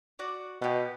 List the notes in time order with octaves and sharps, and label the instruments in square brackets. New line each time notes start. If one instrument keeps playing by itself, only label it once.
[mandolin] F#4 D5
[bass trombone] B2 [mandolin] B3 G4